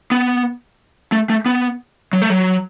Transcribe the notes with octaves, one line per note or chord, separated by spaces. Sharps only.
B3
A3
A3
B3
F#3
A3
F#3